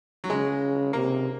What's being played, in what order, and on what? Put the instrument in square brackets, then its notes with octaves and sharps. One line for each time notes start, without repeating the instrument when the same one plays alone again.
[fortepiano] F#3
[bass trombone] C#3 [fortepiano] G#3
[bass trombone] C3 [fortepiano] A#3